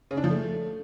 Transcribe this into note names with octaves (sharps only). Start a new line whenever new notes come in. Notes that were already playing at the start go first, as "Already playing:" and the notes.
C#3
D4
F3
A3